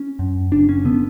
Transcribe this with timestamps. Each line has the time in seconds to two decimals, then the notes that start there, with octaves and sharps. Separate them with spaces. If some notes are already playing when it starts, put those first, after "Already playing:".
Already playing: C#4
0.19 F#2
0.52 F#1 D4
0.69 C#4
0.85 D3 B3